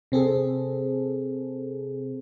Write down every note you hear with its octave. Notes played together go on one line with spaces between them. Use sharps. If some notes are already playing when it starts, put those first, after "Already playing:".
C3 C4 G#4 A4